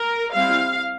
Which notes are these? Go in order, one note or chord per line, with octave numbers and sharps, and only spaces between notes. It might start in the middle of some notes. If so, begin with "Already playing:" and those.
Already playing: A#4
G3 C4 E4 F5